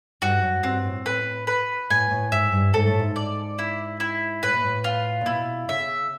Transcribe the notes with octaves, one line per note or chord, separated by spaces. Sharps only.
G2 F#4
F#2
G2 C4
A2
A2 B4
B4
A2 G#5
A2
G#2 E5
G2
G#2 A4
A2
G#2
D5
E4
E4
A2 B4
A#2
A2
F4
A#2
B2 E4
C#3 E5